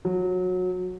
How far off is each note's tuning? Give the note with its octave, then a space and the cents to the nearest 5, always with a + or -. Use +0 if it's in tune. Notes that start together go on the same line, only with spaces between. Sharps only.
F#3 -20